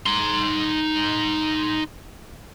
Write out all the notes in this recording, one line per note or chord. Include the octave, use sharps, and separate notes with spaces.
D#4 C6